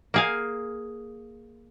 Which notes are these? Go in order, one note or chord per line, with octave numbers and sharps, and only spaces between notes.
A#3 G#4 F5